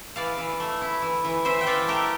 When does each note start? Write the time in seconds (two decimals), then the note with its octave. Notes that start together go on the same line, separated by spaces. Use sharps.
0.16 E3 D5 F5
0.37 E3
0.60 A3
0.81 E4
1.02 E3
1.24 E3
1.45 E3 C5 E5
1.61 G5
1.66 E3 D5 F5
1.88 A3 G4 A#4